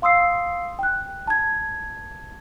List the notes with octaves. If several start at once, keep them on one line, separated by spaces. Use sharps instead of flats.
F5 C6 D#6 E6 C7
G5 F#6
A5 G#6